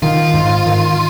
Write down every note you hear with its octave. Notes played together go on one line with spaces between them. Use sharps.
D#3 F4
G#2
D#3